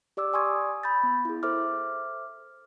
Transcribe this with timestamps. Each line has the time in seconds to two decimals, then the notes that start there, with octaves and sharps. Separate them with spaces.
0.17 G4 D5 D6 E6
0.33 D5 G#5 C6 C#6 D#6 G#6
0.83 B5 G6 A6
1.03 B3
1.25 E4 G#4
1.43 A4 C5 E5 D6 F6